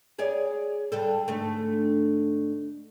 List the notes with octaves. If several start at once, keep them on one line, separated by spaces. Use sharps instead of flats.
G#4 C#5 D5
D3 G3 A4
G#2 D3 A3